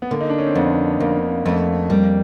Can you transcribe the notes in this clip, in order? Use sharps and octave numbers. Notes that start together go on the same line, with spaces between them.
B3
D3 A#3
D#4
D4
C#4
C4
F2 B3
F2 A#3
F2 A3
G3 A#3